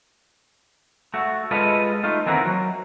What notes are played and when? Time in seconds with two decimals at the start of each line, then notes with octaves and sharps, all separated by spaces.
1.14 A3 F#4
1.51 G#3 F4 A4 B4 D#5
2.03 A3 D#4 F4
2.26 D#3 E3 A#3 C4 F#4
2.46 F#3